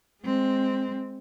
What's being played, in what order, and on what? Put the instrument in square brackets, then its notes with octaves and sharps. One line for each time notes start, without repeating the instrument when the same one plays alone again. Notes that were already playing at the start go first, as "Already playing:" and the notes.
[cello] G#3 C4